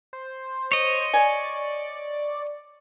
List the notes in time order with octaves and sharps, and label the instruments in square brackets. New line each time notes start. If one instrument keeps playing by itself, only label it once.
[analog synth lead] C5
[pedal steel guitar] C#5 D#5
[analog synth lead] D5 [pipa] G#5